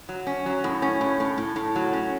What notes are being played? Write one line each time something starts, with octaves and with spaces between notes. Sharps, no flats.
F#3
C#4
F#3
A2
C#4
A2
A2
A2
A2
F#3
C#4